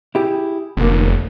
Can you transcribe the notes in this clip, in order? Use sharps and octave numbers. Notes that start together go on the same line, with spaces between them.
E4 G4 G#4
F1 B1 D3 A#3